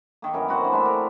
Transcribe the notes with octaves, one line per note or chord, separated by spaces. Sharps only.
D#3 A#3
F#2 E3 A#4
C4 F#4 C5
D3 E3
A3 D4 E4 E5
A#4